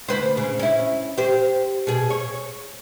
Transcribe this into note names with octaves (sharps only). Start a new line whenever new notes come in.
D2 B4 C5
C#3
C#4 E4
G4 C5
B2 G#4
C#5